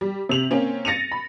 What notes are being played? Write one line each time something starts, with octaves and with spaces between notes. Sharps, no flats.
G3
C3 F7 F#7
A#3 C4 C#4
A6 A#6 C#7 D#7 F7
B5